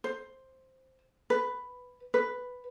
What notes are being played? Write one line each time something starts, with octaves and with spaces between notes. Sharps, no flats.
C5
B4
B4